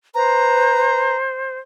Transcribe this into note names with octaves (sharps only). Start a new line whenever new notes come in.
B4 C5 A#5